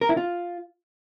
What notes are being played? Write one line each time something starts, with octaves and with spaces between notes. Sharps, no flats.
A#4
E4
F4